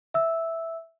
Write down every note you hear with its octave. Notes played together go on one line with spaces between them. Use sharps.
E5 E6